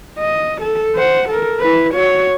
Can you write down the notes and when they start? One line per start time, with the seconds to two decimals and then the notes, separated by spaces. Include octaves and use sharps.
0.19 D#5
0.61 A4
0.95 C5 F#5
1.29 A4 A#4
1.60 E4 B4
1.94 F#4 C#5